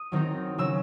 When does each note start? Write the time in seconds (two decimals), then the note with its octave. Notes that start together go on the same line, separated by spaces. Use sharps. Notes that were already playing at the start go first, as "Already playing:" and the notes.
Already playing: D#6
0.12 D#3 F#3 C4 D#4
0.58 C#3 F#3 C#4 E6